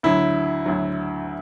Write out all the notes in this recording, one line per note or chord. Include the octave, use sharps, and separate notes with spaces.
D2 D3 F#3 E4
D2 D3 F#3